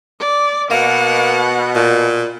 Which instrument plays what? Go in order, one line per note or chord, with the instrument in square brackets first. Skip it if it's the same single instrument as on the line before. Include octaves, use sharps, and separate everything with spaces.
[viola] D5
[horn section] B2 [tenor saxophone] A#3 [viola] F#5
[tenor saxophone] A#2